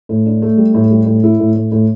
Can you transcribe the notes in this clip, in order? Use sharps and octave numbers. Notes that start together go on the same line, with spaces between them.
A2
D4
A3
G3
A2
G3
A2
E4
A2
A2
A2